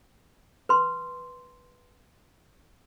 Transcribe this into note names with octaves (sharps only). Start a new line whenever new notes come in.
B4 C6